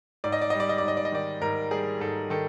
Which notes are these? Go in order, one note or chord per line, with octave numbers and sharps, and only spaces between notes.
G#2 D5
D#5
D5
G3 D#5
D5
D#5
D5
G#2
D#5
D5
D#5
D#3 D5
G#2 A#4
G3 G#4
G#2 A4
D#3 A4